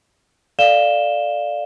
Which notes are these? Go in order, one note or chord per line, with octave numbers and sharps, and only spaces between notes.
A4 D5 F5 E7 G7